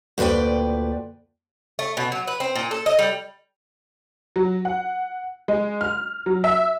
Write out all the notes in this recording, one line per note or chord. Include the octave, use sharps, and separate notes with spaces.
D2 A#2 B4 D5 G5
A3
B2
F#3
B4
C4
A#2
A4
D#5
G3
F#3
F#5
G#3
F6
F#3
E5